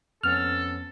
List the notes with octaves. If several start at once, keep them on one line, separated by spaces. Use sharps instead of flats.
F2 B3 C#4 A4 F6